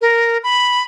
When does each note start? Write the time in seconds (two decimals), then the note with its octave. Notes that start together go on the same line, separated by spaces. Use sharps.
0.01 A#4
0.43 B5